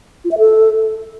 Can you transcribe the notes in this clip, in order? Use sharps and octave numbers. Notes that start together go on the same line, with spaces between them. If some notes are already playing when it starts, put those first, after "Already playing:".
F4
E5
A4